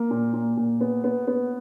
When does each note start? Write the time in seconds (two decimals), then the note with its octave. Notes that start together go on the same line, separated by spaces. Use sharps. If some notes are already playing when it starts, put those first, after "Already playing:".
Already playing: A#3
0.11 A#2
0.34 A#2
0.57 A#2
0.81 B3
1.04 B3
1.27 B3